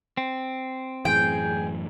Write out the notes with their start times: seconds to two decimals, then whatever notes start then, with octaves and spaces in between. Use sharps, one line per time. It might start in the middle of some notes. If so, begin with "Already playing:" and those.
0.17 C4
1.05 F#2 A2 E3 G#4 G5